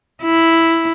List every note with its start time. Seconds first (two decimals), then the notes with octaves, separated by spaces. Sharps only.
0.23 E4